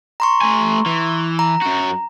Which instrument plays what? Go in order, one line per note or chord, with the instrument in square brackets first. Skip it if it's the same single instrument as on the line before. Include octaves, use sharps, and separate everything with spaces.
[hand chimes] A#5 C6 C#6
[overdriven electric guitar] A3 G#5
E3
[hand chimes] A#5
[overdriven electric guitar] F#2 F#4